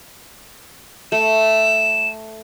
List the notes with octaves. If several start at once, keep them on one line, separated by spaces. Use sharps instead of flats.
A3 E7